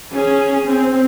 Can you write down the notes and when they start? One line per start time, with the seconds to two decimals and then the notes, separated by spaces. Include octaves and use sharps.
0.12 C#4 G#4
0.67 C4